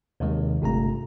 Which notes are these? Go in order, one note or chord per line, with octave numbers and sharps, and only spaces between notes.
D#2 C3 D#3 G#3
G1 G2 C3 A3 A#5